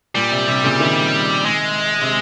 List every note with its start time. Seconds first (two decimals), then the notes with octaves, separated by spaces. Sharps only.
0.15 A#2 G3
0.32 C3
0.48 C3
0.64 A#2 C#3
0.80 C3 D#3
1.46 G#3
2.02 C3